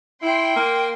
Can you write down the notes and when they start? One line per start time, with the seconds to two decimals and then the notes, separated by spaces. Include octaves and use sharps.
0.22 E4 G5 C6
0.56 A#3